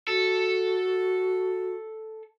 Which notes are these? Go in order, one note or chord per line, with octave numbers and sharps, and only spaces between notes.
F#4 A4